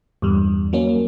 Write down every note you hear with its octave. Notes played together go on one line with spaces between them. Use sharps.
E2 G2 G3
F#3 A#3 C#4